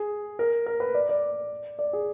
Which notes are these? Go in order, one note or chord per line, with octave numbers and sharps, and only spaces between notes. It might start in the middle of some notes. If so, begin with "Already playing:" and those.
Already playing: G#4
A#4
A#4
B4
D5
D5
D5
G#4